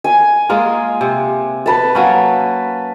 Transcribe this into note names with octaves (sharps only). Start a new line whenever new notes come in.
G#5
G#3 A#3 F4
C3
B4 A5
F#3 A#3 C#4